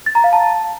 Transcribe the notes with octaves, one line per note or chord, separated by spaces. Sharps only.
A6
A#5
F5
A5